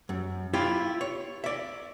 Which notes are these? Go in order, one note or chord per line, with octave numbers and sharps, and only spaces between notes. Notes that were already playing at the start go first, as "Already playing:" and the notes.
F#2
E4 F4 G4
C#5
D5 E5